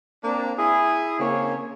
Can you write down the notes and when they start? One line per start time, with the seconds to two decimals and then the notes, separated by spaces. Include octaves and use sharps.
0.23 A#3 C4 D4
0.58 E4 G#4
1.20 C#3 A#3 C4 C#5